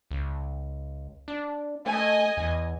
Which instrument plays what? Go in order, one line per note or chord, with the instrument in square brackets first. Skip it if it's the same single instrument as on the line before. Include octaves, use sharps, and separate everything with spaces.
[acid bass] C#2
D4
[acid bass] A3 [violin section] D#5 G#5
[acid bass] E2